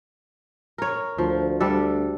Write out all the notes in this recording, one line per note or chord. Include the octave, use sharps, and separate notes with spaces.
A#4 C#5
D2 F3
G3 D4 A4